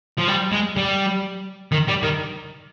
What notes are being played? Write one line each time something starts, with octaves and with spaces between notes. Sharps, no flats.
F3
G3
G#3
G3
D#3
G3
D#3